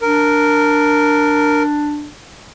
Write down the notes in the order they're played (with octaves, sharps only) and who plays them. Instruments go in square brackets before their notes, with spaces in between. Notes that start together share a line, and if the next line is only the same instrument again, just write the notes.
[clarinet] D4 [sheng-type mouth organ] A#4